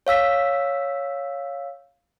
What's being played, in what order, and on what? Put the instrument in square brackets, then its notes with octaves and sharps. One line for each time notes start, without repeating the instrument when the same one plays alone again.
[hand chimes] C#5 F5 E6 B6